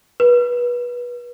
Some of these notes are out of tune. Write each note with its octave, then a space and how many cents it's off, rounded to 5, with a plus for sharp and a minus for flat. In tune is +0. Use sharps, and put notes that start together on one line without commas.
B4 -25